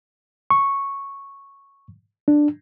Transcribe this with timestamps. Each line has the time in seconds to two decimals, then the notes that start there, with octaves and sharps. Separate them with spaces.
0.50 C#6
2.28 D4